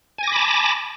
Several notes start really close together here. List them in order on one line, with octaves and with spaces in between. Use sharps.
G#5 A#6 D6 B5 A5